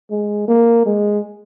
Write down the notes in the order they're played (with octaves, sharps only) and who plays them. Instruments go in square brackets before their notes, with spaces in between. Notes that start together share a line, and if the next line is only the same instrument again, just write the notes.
[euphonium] G#3
A#3
G#3